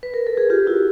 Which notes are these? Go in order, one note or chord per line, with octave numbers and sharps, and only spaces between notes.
B4
A#4
A4
G#4
F4 G4
E4 F#4